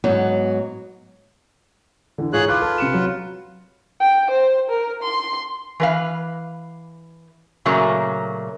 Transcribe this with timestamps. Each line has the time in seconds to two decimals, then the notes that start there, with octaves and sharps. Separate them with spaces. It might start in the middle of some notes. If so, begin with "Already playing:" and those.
0.04 G#2 F#3 B3
2.18 D3 E3
2.33 G#2 F4 G#4 C#5 F#6
2.49 F4 B4 D6 F#6
2.62 A4
2.78 C3 C#7 E7
2.94 F#3
4.00 G5
4.30 C5
4.69 A#4
5.02 C6
5.80 E3 B4 F5
7.65 A#2 C#3 F#3 A3 A#3